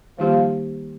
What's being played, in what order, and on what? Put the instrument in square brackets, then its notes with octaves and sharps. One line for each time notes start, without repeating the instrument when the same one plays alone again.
[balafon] D#3 G3 A#3 D#4 G4 [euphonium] F3